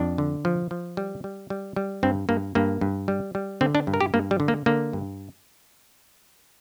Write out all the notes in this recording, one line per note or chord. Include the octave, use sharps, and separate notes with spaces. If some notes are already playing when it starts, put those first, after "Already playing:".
Already playing: F2 D4
D3
F3
F3
G3
G3
G3
G3
G2 C4
G2 A#3
G2 A#3
G2
G3
G3
D3 C4
D4
G2
A#4
G4
G2 A#3
G3
D3
A#3
D3 A#3
G2